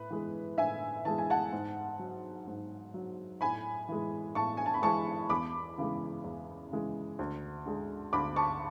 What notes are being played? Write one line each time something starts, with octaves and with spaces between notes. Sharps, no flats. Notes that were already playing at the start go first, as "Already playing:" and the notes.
Already playing: A2 B4
E3 G#3
A2 E5 G#5
E3 G#3 A5
G#5
F#5 A5
G#2
F#3
G#2
F#3
A2 G#5 B5
E3 G#3
A2 A5 C#6
G#5
A5
B5
E3 G#3 A5 C#6
E2 B5 D6
C#3 E3 G#3
E2
C#3 E3 G#3
D2
D3 G#3
D2 B5 D6
A5 C#6